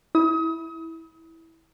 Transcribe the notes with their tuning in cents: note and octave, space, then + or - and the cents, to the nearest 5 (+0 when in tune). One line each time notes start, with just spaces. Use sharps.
E4 -15 D#6 +35